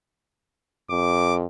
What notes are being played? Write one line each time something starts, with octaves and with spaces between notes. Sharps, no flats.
F2 D6